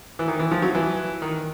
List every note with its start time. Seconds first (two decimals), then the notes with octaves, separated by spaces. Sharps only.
0.19 E3
0.28 D#3
0.39 E3
0.51 F3
0.62 F#3
0.75 E3
1.22 D#3